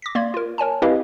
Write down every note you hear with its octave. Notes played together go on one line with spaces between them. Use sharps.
D6 A#6 B6
A#3 D5 C6 G#6
F4 A#4
A#4 C#5 G#5 A5
C4 E4 G4 B4 D#5 F5